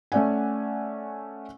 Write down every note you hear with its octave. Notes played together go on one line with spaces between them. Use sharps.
A3 C#4 D5 F#5 G#5